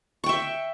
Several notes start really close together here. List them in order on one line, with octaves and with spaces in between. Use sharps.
C#6 G5 E5